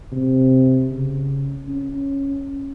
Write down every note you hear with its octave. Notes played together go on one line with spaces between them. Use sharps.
C3
C#3
C#4